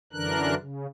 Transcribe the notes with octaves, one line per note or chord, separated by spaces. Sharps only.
F#2 D3 E3 D4 A#4 F#6
C#3